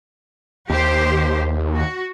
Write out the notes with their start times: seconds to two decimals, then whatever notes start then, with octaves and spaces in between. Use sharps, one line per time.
0.70 D#2 G4 C5
1.74 F#4